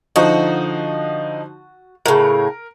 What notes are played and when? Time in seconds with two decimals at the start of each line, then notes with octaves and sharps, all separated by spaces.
0.16 D3 F3 D#4 F#4
2.06 A2 C#3 A#4